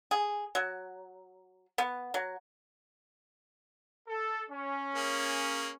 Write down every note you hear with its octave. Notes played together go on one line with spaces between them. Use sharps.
G#4
F#3
B3
F#3
A4
C#4
A#3 G#4